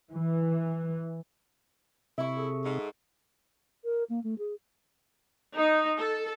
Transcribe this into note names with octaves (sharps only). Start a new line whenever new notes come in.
E3
C3 E4 E5 C#6
G#4 A4
G#2
A#4
A#3
A3
G#4
D#4
A4